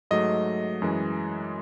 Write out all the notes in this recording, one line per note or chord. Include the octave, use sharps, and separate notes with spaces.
G#2 F#3 A3 D#5
F#2 E3 G#3